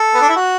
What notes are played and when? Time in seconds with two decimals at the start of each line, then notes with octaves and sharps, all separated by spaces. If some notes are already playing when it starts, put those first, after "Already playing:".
Already playing: A4
0.14 B3
0.22 D4
0.29 E4
0.36 F#4